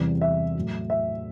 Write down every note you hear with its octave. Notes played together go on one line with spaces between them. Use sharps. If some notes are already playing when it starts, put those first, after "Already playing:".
Already playing: E2 C3 E3 G3
E5
A2 F#3
E5